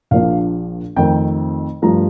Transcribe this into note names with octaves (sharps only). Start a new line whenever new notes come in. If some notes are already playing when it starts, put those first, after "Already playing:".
A#1 A#2 F3 A#3 D4 F5
F2 D#3 A3 C4 G5
G2 F3 A3 A#5